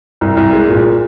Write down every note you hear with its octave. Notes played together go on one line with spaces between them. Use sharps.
C2
C2
G#3
A#2